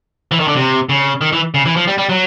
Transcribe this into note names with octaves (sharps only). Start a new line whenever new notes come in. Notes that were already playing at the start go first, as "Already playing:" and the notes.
E3
D#3
D3
C3
C#3
D#3
E3
C#3
E3
F3
G3
G3
F#3